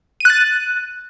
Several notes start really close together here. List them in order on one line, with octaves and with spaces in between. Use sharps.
D#7 F#6 A6